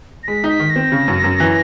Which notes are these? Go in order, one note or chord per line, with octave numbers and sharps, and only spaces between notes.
A#6
G#3 B6
D#4
B6
D#3
A#6
C4
C#3
F#2
F#2
E3